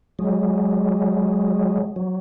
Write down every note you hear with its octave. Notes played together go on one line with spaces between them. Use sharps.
F#3 G#3
F#3